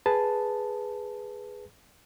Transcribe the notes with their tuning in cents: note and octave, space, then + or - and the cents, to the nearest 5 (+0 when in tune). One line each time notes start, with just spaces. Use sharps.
G#4 +0 B4 +0 A5 +0